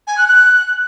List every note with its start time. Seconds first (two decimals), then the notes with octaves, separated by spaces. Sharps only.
0.07 G#5
0.18 F#6
0.28 F#6